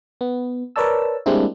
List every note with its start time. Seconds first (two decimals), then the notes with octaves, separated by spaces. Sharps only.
0.21 B3
0.76 A#4 B4 C#5 D5 A5 E6
1.26 G3 G#3 A#3 C4 D4 E4